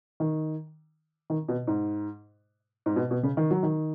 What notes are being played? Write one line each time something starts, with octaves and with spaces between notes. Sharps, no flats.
D#3
D#3
B2
G#2
G#2
B2
B2
C#3
D#3
F#3
D#3